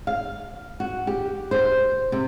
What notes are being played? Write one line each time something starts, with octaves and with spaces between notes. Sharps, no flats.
F5
F#4
G4
C5
C3